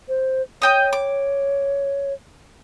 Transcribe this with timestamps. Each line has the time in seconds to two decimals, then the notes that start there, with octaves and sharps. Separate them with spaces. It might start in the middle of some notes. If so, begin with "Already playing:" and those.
0.08 C5
0.62 C#5 D#5 G5 D#6
0.93 D6